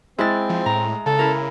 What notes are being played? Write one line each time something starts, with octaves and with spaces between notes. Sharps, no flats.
G#3 C4 E4 A6
F3
A2 A#5
C#3 A4
E4 A#4